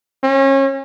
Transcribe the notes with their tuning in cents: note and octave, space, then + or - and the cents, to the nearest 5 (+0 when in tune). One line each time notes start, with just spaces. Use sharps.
C#4 -30